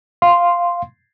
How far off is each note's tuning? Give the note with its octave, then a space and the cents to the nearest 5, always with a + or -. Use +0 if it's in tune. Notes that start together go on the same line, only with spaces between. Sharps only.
F5 +0 C6 +0